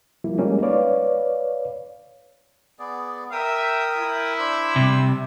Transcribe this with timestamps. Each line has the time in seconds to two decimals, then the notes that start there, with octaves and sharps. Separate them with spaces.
0.24 F3 G3 A#3 E4 F4
0.38 G3 G#3 A#3 C#4 D#4
0.62 B4 C#5 D5 F5
2.79 B3 G#4 D5
3.32 A#4 E5 G5 D#6
3.97 E4
4.39 D4 C5 E6
4.76 C3 G3